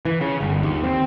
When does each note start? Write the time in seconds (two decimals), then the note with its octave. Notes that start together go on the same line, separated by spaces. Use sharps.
0.05 E3
0.21 C#3
0.41 G1
0.63 D#2
0.84 C4